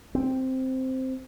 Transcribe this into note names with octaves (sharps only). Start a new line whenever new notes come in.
C4